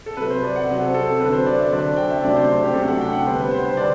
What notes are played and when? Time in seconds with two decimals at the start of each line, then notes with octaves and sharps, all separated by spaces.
0.06 A4
0.17 C3 F#3 C4 B4
0.30 C5
0.43 D5
0.56 F#5
0.68 C3 F#3 C4 F#5
0.81 A4
0.94 A4
1.08 A4
1.20 D3 F#3 C4 B4
1.33 C5
1.46 D5
1.59 E5
1.71 D3 F#3 C4 D5
1.97 G5
2.10 E5
2.23 C3 F#3 A3 D4 D5
2.36 C5
2.48 C5
2.64 G4
2.74 C3 F#3 A3 D4 A4
2.88 F#5
3.01 G5
3.13 F#5
3.26 D3 G3 B3 C5
3.39 B4
3.51 C5
3.65 C5
3.77 D3 G3 B3 D5